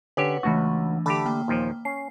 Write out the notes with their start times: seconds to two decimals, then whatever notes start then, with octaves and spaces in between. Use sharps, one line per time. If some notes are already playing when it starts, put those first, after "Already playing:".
0.17 D3 C#4 G4 B4 C#5 F#5
0.43 C#2 E3 A3 D4 F#4
1.06 D3 A3 G4 A5 B5 D6
1.26 A#3 G5
1.48 D#2 A#2 F3
1.85 C#4 C7